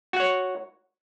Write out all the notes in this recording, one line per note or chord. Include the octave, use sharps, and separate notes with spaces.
F#4 C#5 F#5